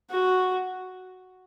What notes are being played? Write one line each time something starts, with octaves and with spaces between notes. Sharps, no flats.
F#4